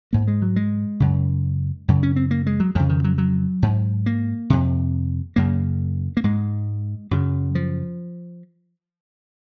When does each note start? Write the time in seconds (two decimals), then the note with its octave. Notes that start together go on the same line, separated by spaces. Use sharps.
0.13 G#2 A#3
0.28 G#3
0.42 F#3
0.56 G#3
1.00 F#2 C#3
1.88 F#2 C#3
2.03 C#4
2.16 C4
2.31 A#3
2.47 G#3
2.60 F#3
2.75 F2 C#3 F3
2.89 D#3
3.04 F#3
3.18 F#3
3.62 G#2
4.06 A#3
4.50 F2 C3
5.36 F#2 C#3 A#3
6.17 A#3
6.24 G#2 G#3
7.11 F#2 C#3 F#3
7.55 F3